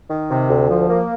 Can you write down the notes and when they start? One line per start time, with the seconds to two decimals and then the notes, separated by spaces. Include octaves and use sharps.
0.09 D#3
0.29 C3
0.49 D2
0.69 F3
0.89 A#3